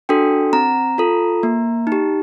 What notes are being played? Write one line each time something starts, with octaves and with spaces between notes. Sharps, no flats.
D4 F#4 A4 G5
C4 A#5
F4 A4
A#3
D#4
G4